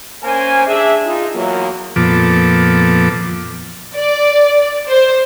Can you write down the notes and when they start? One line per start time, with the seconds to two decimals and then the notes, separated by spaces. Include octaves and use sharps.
0.23 A#3 C#4 A#4 C5 G#5
0.66 D4 G#4 E5
1.06 D#4 F4
1.34 E2 F#3 A#3
1.96 F2 A#2 F3 B3 A4 D6
3.95 D5
4.88 C5